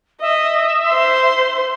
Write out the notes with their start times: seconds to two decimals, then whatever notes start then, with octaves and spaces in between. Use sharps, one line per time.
0.21 D#5 E5
0.88 C5 C6